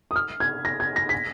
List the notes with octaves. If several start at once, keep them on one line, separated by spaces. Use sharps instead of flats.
D#6
F6
G#6
A#6
G#6
A#6
B6